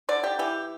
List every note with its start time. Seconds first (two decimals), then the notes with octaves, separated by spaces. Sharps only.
0.09 D3 D5
0.24 G4
0.39 E3 G4